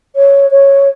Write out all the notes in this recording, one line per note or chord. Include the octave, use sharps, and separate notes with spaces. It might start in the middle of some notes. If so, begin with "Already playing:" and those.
C#5
C#5